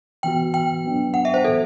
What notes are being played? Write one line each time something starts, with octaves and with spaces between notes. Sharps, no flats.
E3 B3 F#4 G5
G5
F#3 B3 D4
F#5
E5
C5
A2 E3 B3 F#4 A4